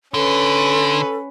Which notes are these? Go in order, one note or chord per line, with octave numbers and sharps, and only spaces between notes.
D3 C#4 A4 B4